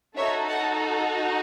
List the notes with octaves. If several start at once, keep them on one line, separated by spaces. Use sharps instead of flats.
D#4 F#4 A4 C#5 E5
F#5 A5